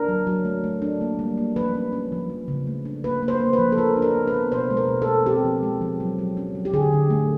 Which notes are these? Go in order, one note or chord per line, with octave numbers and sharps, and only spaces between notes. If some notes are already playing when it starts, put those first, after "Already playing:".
Already playing: D4 A#4
F#3
F#3
A3
A3
D4
A#3
G3
A#3
F3 B4
C#4
C#4
F3
F3
C#3
A3
D4
A#3 B4
A#3
C5
A#3
B4
F3
A4
D4 A#4
D4
A#4
B3
B4
B3
B2 C5
G#3
A#4
B2
A4
B3
C4 G4
F3
G#3
F3
F#3
F#3
C#4
F#3
G4
D3 G#4
D3
A3